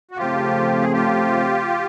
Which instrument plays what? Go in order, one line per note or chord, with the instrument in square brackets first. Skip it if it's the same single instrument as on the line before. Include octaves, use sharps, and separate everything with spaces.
[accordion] F#4
[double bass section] C#3 F3 A3 C4 [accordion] F4 G4
[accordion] G#4
F4 G4